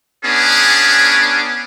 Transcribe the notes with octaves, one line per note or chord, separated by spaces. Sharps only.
B3 C#4 D4 G#4